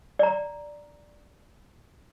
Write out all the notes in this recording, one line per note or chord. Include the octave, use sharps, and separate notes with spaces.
D5 A#5